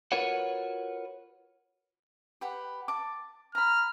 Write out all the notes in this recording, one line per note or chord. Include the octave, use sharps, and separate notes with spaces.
F4 F#4 A#4 B4 C#5 F#5
G4 B4 F#5
A5 D6
A#5 B5 F6